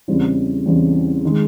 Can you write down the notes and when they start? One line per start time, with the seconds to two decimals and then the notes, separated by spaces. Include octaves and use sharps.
0.08 E2 C#3 E3 G3 C4
0.66 E2 C#3 E3 G3 C4
1.25 D#3 G#3